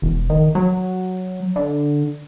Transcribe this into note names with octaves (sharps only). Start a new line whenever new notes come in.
E1
D#3
F#3
D3